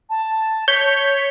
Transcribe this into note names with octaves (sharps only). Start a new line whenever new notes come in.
A5
C#5 G6 B6